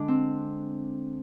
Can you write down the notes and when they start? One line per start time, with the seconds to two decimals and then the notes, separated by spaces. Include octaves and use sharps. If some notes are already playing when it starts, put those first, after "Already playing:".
Already playing: D3 G#3 D4
0.08 C4